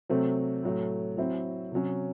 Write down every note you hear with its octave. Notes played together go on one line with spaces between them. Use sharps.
C3 F#3 A3 C4
A2 F#3 A3
F#3 C4 E4
C3 F#3 C#4